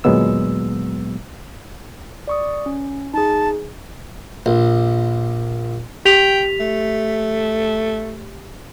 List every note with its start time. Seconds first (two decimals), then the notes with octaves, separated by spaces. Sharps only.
0.04 D2 A#2 F#3 G#3 B3 E6
2.28 D5 C#6 D#6
2.66 C#4
3.14 D#4 G#4 A5
4.46 A#1
6.05 G4 G5 B6 F7
6.60 A3